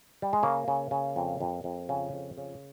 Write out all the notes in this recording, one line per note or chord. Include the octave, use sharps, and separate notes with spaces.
G3
G#3
C#3 A#3
C#3
C#3
F2
F2
F2
C#3
F2
C#3